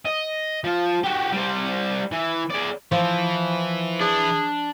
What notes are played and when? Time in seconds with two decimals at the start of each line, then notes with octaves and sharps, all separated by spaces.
0.05 D#5
0.64 F3
1.04 F#4 G4
1.32 G3 C5
2.12 E3
2.50 G#4 D5
2.92 E3 F3
4.01 D4 G#4